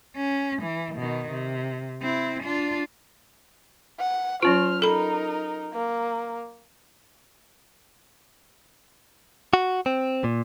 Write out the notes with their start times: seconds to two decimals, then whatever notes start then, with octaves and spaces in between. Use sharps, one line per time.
0.17 C#4
0.62 E3
0.96 B2 D#3
1.32 C3
2.02 C4 E4
2.43 D4 F4
3.99 F#5
4.43 F#3 C#4 F4 C5 F6
4.82 D#4 A4 A#4 B5
5.74 A#3
9.53 F#4
9.86 C4
10.24 A#2